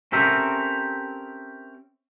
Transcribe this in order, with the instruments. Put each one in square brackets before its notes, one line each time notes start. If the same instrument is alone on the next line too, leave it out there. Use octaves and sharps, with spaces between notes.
[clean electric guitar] C4 C#4 G4 A4 A#4 E5